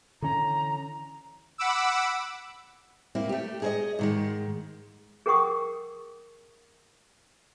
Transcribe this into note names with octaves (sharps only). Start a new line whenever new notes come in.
D3 E3 C#4 A#5
F#5 B5 D6 E6
A#3 C4 E4
A3 G4
G#4 A#4 C5 C#5 D#5
G#2 D#3 G#3
G#4 A#4 F#5 G5 C#6 D#6